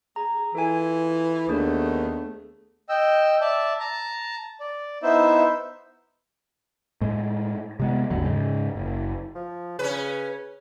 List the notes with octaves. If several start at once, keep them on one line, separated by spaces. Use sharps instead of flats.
G#4 A#5
E3 F4 A4 G#5
D#2 A3 B3 D4 G#4
D#5 G5 E6
D5 E5 A5
A5 A#5
D5
B3 D#4 E4 C5 E5
A2 G#3
C3 G#3 B3
G#1 D#2 D3 F#3
G#2 C#3 G#3
F#1
F3
C#3 C#4 B4